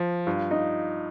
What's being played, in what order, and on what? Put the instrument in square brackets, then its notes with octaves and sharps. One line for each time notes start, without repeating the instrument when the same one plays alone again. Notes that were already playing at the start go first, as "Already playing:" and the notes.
Already playing: [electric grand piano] F3
[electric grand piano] G2 [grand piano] F4
[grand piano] D#4